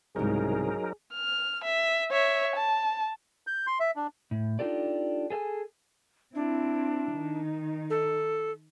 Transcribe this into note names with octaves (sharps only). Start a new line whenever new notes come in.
C2 G#2 C#3 F#3 D#4 G#4 A#4
F6
E5
C#5 E5
A5
G6
C6
E5
D4
A2
D4 D#4 F4 G4 A4 D5
G#4 A4 F5 G#5
C4 D4 E4
D#3 D#4
A4